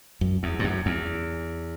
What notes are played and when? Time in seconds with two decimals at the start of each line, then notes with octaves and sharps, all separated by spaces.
0.21 F#2
0.43 E2
0.59 G2
0.64 F#2
0.86 E2